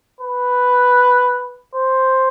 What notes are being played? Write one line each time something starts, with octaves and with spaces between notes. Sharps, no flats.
B4
C5